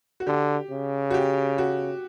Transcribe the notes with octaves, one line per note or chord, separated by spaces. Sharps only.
F#4
D3 G4
C#3
F#4
G4
F#4